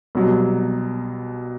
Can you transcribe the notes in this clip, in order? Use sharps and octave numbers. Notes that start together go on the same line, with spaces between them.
C2 B2 F#3